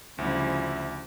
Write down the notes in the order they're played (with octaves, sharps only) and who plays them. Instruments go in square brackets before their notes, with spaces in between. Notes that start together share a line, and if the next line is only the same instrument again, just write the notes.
[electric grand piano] D2 [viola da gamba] C#3 E4 [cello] F3 G3 [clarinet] E5